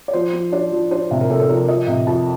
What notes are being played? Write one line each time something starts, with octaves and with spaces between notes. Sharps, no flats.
D5
F3 C5
F3
D4 D5
F3
D4 C5
C3
A#4
C3 A4
A4
F3 A#4
F3 D#5
C3
F2 A5